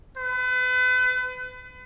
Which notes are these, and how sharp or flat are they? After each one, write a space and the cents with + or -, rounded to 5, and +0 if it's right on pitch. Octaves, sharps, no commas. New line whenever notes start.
B4 +35